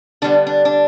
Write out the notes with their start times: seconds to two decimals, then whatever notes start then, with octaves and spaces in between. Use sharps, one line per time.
0.22 D3 G3 B3 D4
0.47 D4
0.65 D4